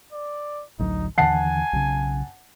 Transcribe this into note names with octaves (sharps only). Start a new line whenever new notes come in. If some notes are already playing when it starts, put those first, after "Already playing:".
D5
A1 D2 F#3 D#4
D#2 D3 E3 F#5 G#5 A5 C7
B1 C#3